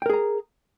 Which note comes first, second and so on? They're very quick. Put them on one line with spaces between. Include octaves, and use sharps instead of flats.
G5 A#4 G#4 A#5